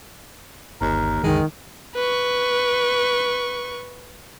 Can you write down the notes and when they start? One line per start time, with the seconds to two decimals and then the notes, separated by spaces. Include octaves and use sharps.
0.81 G1 D#2 A#4
1.23 C2 F#2 D3 D#3 G#3
1.95 B4 C#6